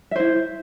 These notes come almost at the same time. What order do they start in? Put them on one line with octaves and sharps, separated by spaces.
E5 C5 E4